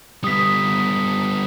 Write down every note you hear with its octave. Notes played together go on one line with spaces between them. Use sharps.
G3 B3 D#6 B6